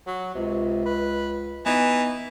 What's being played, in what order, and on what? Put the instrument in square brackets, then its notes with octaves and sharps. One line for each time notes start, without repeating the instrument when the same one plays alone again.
[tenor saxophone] F#3
[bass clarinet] C#2 [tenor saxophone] C3
[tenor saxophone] B4
[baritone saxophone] E3 [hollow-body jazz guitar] B3 [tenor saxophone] D#4